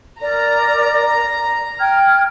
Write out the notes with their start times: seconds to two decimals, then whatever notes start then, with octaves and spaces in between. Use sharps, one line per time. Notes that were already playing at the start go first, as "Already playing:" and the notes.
0.21 A#4 D5 A#5
1.78 G5 F6 G#6